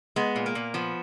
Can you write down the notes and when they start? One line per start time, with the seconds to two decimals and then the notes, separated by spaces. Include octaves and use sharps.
0.16 G#3 B3
0.36 A#2
0.46 A#3
0.55 A#2
0.74 F3 B3